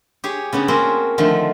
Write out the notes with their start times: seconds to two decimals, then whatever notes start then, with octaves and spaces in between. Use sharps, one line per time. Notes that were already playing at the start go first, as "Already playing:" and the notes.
0.24 G4 G#4 C#5
0.53 C#3 B3 C#4 D4
0.68 A#3 C4 C#4 F#4 G#4
1.18 D3 D#3 F3 A3